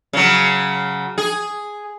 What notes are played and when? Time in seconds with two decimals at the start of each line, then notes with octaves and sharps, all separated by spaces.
0.13 C#3 F#3
1.18 G#4